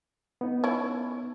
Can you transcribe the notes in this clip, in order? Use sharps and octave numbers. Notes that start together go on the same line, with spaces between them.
B3 D#4
C#4 E4